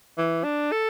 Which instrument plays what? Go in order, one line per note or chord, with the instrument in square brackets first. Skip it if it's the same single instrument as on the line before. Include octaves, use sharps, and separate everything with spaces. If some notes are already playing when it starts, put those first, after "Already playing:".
[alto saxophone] E3
D4
A4